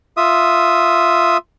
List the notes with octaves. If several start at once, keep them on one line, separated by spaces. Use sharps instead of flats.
F4 E5 D#6